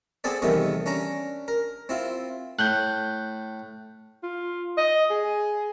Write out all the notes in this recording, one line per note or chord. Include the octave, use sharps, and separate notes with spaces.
B3 C4 G#4 A4 D5
E2 C3 D#3 G3 A3 B3
C#4 D4 A#5
A#4
C4 E4 F4
A2 F#6 G6
F4
D#5
G#4